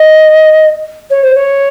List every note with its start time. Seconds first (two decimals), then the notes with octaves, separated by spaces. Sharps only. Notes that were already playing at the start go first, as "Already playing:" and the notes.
Already playing: D#5
1.10 C#5
1.22 C5
1.34 C#5